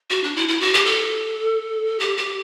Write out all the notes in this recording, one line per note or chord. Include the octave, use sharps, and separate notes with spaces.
F#4
D4
E4
E4
F#4
G4
A4
G4
G4